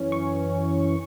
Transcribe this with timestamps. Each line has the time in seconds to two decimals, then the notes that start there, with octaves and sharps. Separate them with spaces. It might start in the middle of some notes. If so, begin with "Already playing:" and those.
Already playing: F#2 E3 C#4
0.12 C#6